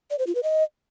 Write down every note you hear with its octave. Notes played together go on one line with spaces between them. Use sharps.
D5
C5
F4
B4
D#5